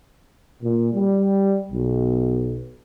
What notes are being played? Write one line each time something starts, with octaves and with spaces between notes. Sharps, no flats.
A#2
G3
B1